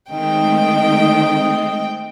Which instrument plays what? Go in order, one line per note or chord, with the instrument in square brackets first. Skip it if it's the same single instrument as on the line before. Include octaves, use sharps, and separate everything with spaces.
[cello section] D#3 [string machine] G#3 A3 C4 [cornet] D#5 [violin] G5